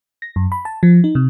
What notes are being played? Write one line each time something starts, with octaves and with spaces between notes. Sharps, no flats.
A#6
F#2
B5
A5
F3
D#4
C3